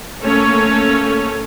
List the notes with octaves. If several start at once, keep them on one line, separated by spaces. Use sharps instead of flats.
A3 A#3 C#4 A4 C#5